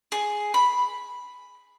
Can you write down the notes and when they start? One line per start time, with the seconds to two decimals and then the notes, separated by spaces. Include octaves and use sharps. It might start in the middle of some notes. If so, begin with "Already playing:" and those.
0.12 G#4
0.54 B5